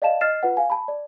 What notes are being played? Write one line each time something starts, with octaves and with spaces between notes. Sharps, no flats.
D5 D#5 F5 A5 E7
D#5 F6 A6 C7 E7
F4 B4 F#5
F5 G#5
A5 B5
D5